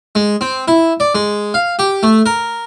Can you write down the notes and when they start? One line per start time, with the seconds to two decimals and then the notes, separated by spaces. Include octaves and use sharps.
0.15 G#3
0.41 C4
0.68 E4
1.00 D5
1.15 G#3
1.54 F5
1.79 G4
2.03 A3
2.26 A#4